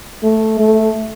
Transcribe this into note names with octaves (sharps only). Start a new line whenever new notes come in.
A3
A3